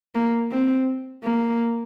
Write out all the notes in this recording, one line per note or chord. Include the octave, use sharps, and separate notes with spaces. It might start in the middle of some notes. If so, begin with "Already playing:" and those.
A#3
C4
A#3